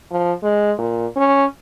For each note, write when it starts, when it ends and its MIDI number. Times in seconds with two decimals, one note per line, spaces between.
0.11 0.32 53
0.43 0.72 56
0.78 1.06 46
1.16 1.45 61